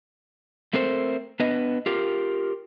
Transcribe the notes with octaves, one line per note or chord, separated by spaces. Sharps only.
A3 C4 A4 A#4 C5
B3 D4 B4 D#5
F4 G4 A#4